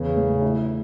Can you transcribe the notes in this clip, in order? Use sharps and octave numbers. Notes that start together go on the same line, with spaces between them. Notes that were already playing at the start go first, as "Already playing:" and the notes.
Already playing: E2 C#3 B4
A2
E4